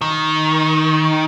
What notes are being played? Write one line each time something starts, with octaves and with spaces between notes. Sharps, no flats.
D#3